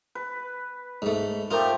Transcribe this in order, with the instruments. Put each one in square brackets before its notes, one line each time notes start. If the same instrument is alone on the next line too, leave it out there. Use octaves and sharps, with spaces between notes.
[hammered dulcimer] B4
[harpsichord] G#2 A3
[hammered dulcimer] F3 A3 G4 [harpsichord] F4 A#4